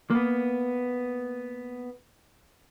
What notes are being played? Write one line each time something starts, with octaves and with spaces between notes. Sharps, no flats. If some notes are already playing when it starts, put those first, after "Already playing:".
A#3 B3